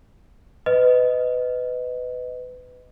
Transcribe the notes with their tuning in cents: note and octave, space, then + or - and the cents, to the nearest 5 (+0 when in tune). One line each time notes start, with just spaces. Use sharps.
B4 +25 D#5 +0